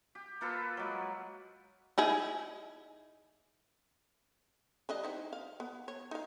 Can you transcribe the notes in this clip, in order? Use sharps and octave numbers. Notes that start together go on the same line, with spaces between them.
G4
A#3 F4 A4 B4
F#3 G#3
D#4 E4 G#4
G3 D4 D#5
C4 D#4 E4
F5
B3
C#5
D#4 F5